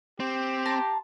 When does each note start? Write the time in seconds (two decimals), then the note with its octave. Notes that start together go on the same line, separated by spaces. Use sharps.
0.20 C4 G4
0.65 A5 A#5 C6